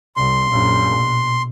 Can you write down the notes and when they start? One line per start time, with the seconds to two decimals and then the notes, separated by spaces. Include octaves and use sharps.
0.16 C2 C6
0.51 A#1 F#2
0.95 B2